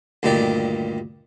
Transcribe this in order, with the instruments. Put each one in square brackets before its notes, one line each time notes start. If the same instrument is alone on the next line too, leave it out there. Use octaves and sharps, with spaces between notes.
[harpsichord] D2 G2 A#2 D#3 G4 D5